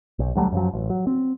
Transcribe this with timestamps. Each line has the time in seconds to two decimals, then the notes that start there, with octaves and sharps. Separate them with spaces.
0.19 B1
0.36 D2 F#3 G3 A3
0.52 F#2 F3 F#3
0.73 A1
0.90 F#3
1.07 C4